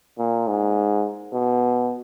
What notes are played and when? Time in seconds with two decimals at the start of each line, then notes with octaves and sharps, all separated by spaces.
0.19 A#2
0.48 G#2
1.33 B2